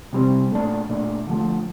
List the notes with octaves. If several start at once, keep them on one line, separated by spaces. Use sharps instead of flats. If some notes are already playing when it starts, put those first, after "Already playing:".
C3 G3 C4
A#2 A3 D4
A#2 A3 D4
D3 F3 A3